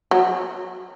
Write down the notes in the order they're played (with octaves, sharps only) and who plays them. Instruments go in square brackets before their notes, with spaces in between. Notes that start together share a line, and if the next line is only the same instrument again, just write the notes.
[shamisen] F#3